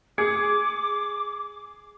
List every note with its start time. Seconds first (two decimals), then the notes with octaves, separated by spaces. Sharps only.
0.18 G#4 D6 G#6 C#7